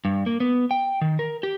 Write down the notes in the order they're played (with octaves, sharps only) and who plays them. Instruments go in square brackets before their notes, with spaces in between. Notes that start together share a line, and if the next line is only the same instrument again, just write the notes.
[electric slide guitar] G2
A#3
B3
G5
D#3
A#4
G4